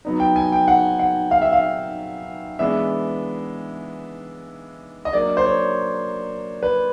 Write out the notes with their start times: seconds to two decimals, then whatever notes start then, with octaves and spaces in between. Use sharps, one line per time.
0.05 F#3 B3 D#4
0.20 G5
0.36 G#5
0.52 G5
0.68 F#5
0.99 F#5
1.31 F5
1.42 E5
1.53 F5
2.59 E3 G#3 B3 D4 E5
5.05 D#5
5.13 F#3 A#3 D4 D5
5.37 C5
5.45 C#5
6.63 B4